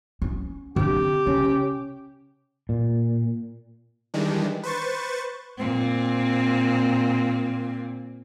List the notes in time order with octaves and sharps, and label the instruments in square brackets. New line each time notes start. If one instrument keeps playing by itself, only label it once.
[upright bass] C#4
[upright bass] D3 C4 [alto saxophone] G4
[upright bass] C#3 [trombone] C#4
[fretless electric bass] A#2
[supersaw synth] D#3 E3 G3 G#3 D4
B4 C5 C#6 A6
[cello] A#2 C4